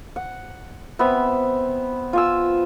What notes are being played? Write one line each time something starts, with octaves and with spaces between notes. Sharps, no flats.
F#5
B3 C4 E5 B5
F4 G#5 E6